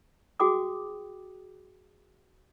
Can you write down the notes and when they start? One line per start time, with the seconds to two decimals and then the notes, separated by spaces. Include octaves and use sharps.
0.40 F#4 G#4 G5 D6 D#6